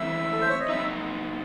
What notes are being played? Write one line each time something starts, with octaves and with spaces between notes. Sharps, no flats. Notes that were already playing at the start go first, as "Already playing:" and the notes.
Already playing: E3 A3 C4 E4 E5
A4
C5
C#5
D#5
F#3 C4 D#4 E5